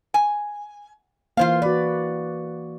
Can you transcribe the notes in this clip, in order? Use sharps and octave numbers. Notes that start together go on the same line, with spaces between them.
G#5
E3 A#3 F4 C5 F5
F#4 B4 D5